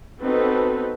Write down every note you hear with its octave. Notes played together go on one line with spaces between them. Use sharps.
B3 C4 D#4 F#4 A4 B4